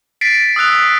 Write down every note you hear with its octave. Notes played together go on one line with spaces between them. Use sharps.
A6 B6 C7 D7
D#6 E6 F#6 F7